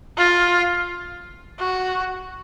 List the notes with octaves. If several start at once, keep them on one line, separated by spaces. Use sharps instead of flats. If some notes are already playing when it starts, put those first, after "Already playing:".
F4
F#4